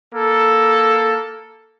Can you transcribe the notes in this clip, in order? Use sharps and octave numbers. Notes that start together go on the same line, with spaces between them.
A#3 A4